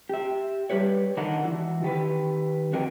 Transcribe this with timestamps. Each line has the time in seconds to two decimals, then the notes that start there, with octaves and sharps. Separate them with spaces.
0.09 G4 E5
0.70 G3 G4 B4 C#5
1.17 D#3 D4 D#4 A#4 D#5 F#5
1.43 E3 E4 F#4
1.83 D#3 G4 B4
2.73 F2 F#4 A#4 D#5 G5